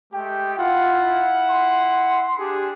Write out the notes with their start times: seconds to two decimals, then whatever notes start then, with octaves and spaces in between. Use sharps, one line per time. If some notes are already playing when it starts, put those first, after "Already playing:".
0.13 G#3 A3 G4 G5
0.59 E4 F4 F#5
1.50 C6
2.39 D4 G4 G#4